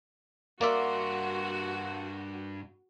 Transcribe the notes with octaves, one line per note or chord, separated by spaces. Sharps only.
G2 A#3 F#4 D5 E5 C6